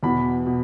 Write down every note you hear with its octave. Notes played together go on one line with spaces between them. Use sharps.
E2 B2 B5
B2